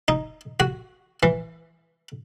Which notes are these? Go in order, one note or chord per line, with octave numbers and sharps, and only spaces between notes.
D#4
F#4
E3